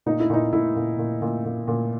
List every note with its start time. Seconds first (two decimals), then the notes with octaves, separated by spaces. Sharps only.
0.06 A#2 D#4
0.20 E4
0.30 A#2 D#4
0.52 A#2 E4
0.76 A#2
0.98 A#2
1.22 A#2
1.45 A#2
1.67 A#2